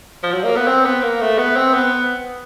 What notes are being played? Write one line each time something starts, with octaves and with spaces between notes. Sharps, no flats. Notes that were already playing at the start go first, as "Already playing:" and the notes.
F3
F#3
A#3
B3
C4
B3
A#3
A3
B3
C4
B3